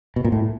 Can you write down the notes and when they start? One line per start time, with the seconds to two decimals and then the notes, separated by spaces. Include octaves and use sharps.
0.16 B2
0.24 A#2
0.32 A2